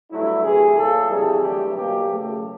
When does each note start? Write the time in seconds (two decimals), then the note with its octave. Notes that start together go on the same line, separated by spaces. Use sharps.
0.11 G2 D3 F#3 A3 E4
0.43 C3 E3 A3 G#4
0.76 A#2 F#3 A#3 A4
1.09 F2 C3 E3 G3 G#4
1.41 G2 D3 F#3 A3 G4
1.74 B2 F#3 A#3 G4
2.07 E2 C#3 F#3 A3